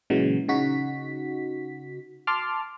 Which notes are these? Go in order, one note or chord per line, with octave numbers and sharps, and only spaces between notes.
A#2 C#3 E3 F#3 G#3
C#3 D#4 F#4 B6
A5 C6 D6 F6